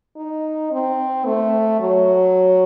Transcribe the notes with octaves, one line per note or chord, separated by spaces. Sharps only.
D#4
C4
A3
F#3